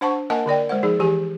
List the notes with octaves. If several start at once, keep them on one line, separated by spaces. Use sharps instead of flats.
D4 C5 F#5 A5 C#6
A#3 A#4 D#5 F#5 G#5 A5
D3 A#4 D5 G5
G#3 C5 F#5
F3 D#4 G#4
E3 G4 G#5